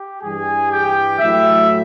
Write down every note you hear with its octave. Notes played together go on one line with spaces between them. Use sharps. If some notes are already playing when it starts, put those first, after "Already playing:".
Already playing: G4
G2 E3 G3 G#4 G#5
G4 G5
A2 F#3 A3 E4 E5